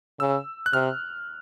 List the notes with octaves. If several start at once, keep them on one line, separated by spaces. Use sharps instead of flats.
C#3 E6
F#6
C3 F6